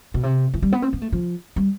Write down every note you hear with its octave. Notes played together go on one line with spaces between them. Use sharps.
B2
C3
E3
G3
B3
C4
B3
A3
F3
G3